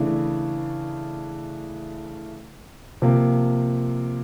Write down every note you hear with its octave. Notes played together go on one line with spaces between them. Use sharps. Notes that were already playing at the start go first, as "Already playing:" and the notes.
Already playing: C#3 E3 A3 D4
C3 F3 A#3